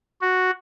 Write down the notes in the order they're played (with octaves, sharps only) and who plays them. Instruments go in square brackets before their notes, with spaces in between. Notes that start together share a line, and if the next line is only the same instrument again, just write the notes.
[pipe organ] F#4